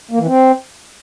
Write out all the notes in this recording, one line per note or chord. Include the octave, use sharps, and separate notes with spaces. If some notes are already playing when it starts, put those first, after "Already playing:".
A#3
E3
C4